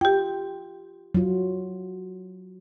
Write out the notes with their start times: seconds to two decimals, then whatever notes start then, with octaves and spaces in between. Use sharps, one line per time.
0.01 F4 G4 G5
1.15 F#3 F4